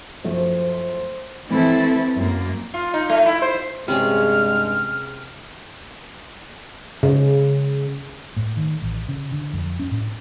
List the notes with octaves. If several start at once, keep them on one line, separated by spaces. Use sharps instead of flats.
F#2 F3 A3 C5
E3 A3 C4 E4 A4
F#2 A#3
F4
D#4
A3
E4
C5
G2 C3 G#3 C#4 G#4 F6
C#3
A2
D#3
A1
C#3
D3
F2
C#4
A2